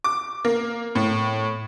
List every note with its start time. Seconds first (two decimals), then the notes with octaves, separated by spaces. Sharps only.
0.04 D6
0.45 A#3
0.95 A2